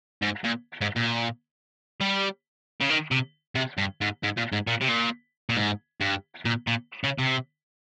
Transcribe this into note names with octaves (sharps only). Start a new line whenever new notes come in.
G#2
A#2
G#2
A#2
G3
C#3
D#3
C3
C3
G2
G#2
G#2
A#2
G#2
A#2
C3
A#2
A#2
G#2
G2
A#2
A#2
C#3
C3